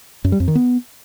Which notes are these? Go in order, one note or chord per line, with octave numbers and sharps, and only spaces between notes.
F#2
G3
F2
D#3
B3